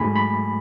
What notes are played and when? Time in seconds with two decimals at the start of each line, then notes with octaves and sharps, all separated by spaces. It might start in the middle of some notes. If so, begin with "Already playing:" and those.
Already playing: G#2 F#3 A3 G#5 B5
0.15 B5